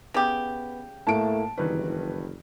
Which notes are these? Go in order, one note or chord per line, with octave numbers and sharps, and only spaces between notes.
C#3 B3 G4
A2 A3 A#3 A5 D7
F#1 G2 D#3 E3 B4